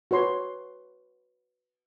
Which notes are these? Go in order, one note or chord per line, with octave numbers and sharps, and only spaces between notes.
F#4 B4 C#5 C6